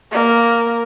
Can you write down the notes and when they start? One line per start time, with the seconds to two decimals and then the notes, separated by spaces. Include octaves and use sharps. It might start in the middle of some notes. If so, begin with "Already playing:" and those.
0.12 A#3